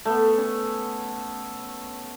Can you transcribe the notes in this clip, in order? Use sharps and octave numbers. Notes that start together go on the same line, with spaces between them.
A3 B3
C#4